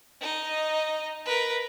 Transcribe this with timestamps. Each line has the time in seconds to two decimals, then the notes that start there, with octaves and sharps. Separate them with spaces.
0.21 D#4 D#5
1.25 A#4 B4